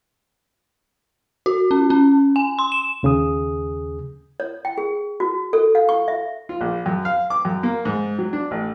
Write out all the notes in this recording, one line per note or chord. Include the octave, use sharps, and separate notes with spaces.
F#4
C#4
C#4
G#5
C6
E7
D#2 C#3 G#4 D#6
C#5
G5
G#4
F#4
A4
F5
C#6
E5
F4
A#1
F#2
F5
D6
F#2
A#3
G#2
F#3
D4
A1